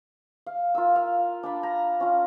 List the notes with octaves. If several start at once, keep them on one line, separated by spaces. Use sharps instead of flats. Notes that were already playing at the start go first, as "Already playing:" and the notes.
F5
F4 A#4 E6
F5
D4 A5 B5
A#5
C#4 F4